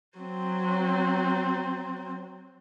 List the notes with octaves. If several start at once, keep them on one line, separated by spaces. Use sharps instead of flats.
F#3 C4